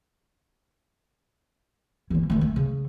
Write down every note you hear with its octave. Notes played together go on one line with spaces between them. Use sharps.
E3 A#3
D#3 A3
A3
C#3